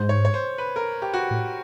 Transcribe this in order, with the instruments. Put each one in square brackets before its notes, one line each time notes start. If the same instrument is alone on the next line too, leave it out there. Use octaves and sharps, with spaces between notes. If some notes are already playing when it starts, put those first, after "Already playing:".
Already playing: [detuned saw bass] G#2 [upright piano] C5
[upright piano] C#5
C#5
C5
B4
A#4
G4
F#4
[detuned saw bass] A2